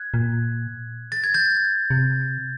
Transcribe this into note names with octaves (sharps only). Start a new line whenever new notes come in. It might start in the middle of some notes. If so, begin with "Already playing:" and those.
Already playing: F#6 G#6
A#2
A6
G#6
G6 A6
C3